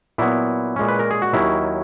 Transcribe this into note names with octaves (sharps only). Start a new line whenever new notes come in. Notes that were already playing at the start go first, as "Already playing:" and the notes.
A#2 F#3 B3 E4
A#2 G#3 C#4
B4
A#4
G#4
F#4
D#2 D#3 F#3 C#4 E4